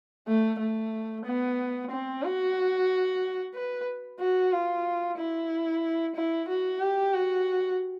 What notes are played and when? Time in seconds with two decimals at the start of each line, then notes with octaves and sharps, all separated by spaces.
0.28 A3
0.60 A3
1.26 B3
1.91 C4
2.23 F#4
3.54 B4
4.20 F#4
4.52 F4
5.18 E4
6.16 E4
6.49 F#4
6.81 G4
7.14 F#4